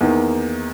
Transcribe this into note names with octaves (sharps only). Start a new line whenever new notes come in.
E2 D#3 A#3